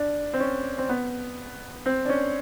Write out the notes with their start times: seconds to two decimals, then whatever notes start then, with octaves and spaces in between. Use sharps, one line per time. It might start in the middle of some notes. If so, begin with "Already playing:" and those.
Already playing: D4
0.34 C4
0.40 C#4
0.78 C4
0.89 B3
1.86 C4
2.05 D4
2.09 C#4